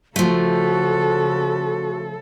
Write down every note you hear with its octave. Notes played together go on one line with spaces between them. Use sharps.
C#3 F3 A3 F#4 A4